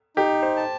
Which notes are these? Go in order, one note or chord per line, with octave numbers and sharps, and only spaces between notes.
D#4 G4
C5
A5